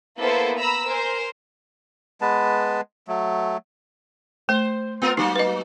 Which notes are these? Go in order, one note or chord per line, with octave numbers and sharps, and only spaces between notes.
A#3 B3 E4 A4 C5
A#5 B5 E6
A#4 C5 G#5
G#3 B3 B4 A5
F#3 A3
A3 C5
B3 F4 A#4
F#3 A#3 D#4
B4 D#5